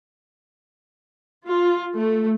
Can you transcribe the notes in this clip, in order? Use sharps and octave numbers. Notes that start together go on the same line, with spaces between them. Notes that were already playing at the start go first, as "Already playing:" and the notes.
F4
A3